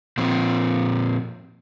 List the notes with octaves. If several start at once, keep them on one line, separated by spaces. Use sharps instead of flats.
A#2 F3 C4